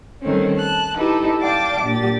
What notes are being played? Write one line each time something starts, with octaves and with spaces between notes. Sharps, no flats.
D#3 G3 A3 C4 C#4
A5 F#6
D#4 E4 G4 A4 B4
D5 F5 G5 A5 D6 A6
A#2 D4 G4 A6